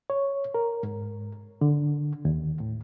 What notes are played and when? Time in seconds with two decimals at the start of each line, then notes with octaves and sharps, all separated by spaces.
0.10 C#5
0.54 A#4
0.83 G#2
1.61 D3
2.25 D#2
2.60 A2